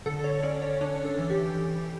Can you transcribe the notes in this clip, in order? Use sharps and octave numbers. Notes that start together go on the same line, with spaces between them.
D3 A4
C#5
C#4 D5
C#5
D4 C#5
A4
E3
G4
E3